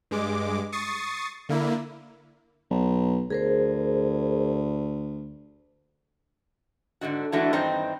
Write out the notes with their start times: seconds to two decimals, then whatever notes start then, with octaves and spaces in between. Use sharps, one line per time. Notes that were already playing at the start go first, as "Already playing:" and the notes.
0.11 G2 G#3 D6
0.72 C#6 D#6 A6 C7
1.49 D3 A#3 E4
2.71 B1
3.30 D2 G#4 A#4 C5
7.01 G#2 D3 D#3 F#4
7.32 E3 G#3 A3 D4 E4 F#4
7.53 G2 D#3 E3 C4 D#4